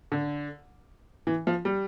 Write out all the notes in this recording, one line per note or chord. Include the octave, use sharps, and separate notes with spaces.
D3
E3
F3
G3